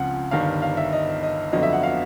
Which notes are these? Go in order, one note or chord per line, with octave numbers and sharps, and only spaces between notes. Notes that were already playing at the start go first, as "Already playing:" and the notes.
Already playing: C#2 C#3 F3 C4 F#5
G1 G2 D#3 F5
F5
E5
D#5
D#5
G1 F2 D3 F#3 B3 D#5
E5
F#5
F5